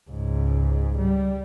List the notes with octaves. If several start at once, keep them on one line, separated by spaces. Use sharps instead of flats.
C#2 G#2
G3